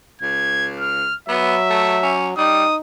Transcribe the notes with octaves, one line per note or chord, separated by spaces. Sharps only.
C#2 G#6
F6
F#3 B3 E5
A3
C#4
G3 D#4 D#6